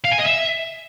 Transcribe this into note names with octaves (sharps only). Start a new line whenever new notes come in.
F5
G#5
D#5
E5